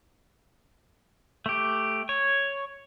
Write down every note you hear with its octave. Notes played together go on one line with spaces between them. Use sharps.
A3 G4
C#5